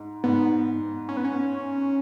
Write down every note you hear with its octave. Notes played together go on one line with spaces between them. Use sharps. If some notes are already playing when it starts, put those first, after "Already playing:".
Already playing: G#2
G#2 B3
C#4
B3
C#4